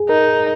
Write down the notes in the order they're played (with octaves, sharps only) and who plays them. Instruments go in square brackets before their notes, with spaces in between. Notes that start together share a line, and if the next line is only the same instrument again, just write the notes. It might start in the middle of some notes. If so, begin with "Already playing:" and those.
Already playing: [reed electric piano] G#4
[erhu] D#4 [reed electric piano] A#4